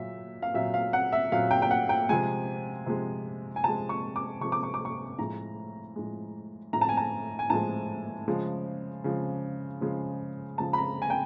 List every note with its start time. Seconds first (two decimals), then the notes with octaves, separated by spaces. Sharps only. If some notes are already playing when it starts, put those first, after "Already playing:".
Already playing: A#2 F#3 E5
0.42 F5
0.54 A#2 F#3 E5
0.74 F5
0.93 F#5
1.12 E5
1.32 A#2 F#3 F5
1.51 G5
1.62 G5
1.71 F#5
1.89 G5
2.09 C3 F3 G#3 G#5
2.86 C3 F3 G#3
3.56 G#5
3.64 C3 F3 G#3 A5
3.89 C#6
4.16 D6
4.40 C3 F3 G#3 C#6
4.52 D6
4.63 C#6
4.74 D6
4.85 C#6
5.19 A2 F3 G#3 A#5
5.96 A2 F3 G#3
6.73 A2 F3 G#3 A#5
6.81 A5
6.89 G#5
6.97 A5
7.39 G#5
7.50 A2 F3 G#3 A5
8.28 C#3 F3 G#3
9.04 C#3 F3 G#3
9.81 C#3 F3 G#3
10.58 C#3 F3 G#3 A5
10.73 B5
10.78 A#5
11.02 G#5
11.10 G5